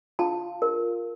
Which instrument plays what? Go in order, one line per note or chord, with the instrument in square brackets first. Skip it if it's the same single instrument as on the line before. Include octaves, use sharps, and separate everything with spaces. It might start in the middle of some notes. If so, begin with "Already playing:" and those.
[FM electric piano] F4 [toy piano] A5
[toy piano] A#4